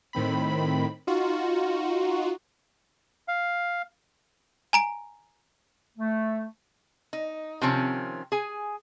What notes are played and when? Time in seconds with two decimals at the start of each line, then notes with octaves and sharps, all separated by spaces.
0.13 A2 D#3 C4 B5
1.07 D#4 F4 F#4
3.28 F5
4.73 G#5 A#5 D7
5.98 A3
7.13 D#4
7.62 C3 D#3 F3 C4 C#4
8.32 G#4 G#5